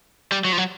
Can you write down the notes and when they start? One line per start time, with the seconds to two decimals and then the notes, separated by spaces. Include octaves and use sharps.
0.32 G3
0.45 F#3
0.52 F3
0.58 F#3